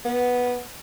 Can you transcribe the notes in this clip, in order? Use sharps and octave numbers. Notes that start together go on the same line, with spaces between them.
B3